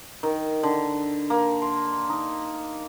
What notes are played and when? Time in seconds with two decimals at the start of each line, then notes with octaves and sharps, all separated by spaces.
0.23 D#3
0.63 D3
1.30 A#3
1.62 C6
2.09 D#4